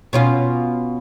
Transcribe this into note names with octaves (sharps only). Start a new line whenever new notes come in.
B2 C#4 F4